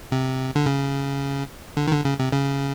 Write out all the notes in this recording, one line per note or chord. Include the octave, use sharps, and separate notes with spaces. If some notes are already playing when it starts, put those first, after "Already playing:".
C3
D3
C#3
D3
D#3
D3
C#3
C3
C#3